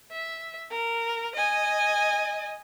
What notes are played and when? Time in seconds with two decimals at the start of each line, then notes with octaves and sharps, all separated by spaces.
0.12 E5
0.71 A#4
1.35 D#5 G#5